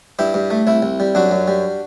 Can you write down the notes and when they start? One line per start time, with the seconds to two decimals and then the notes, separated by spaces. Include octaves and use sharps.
0.19 G2 E4 G4
0.34 G2
0.50 A3
0.67 C2 E4
0.83 C2
1.00 G3
1.15 F#2 D4 F#4
1.31 F#2
1.48 G3